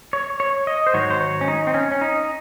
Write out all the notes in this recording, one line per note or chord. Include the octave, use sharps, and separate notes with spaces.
C#5
C#5
D#5
C5
G#2 D#3 F#3 C#5
C5
C#5
C#4
D#4
C4
C#4
C#4
D#4